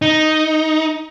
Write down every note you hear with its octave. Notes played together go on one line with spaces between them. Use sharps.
D#4